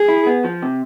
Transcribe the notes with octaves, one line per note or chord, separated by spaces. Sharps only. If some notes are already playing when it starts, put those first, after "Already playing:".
Already playing: G#4
E4
B3
F3
C3